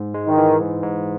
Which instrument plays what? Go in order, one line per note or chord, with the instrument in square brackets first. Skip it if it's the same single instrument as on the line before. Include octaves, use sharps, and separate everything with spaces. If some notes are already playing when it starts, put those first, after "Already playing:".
Already playing: [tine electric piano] G#2
G#3
[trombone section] D#3
[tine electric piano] E3
G#2
G#2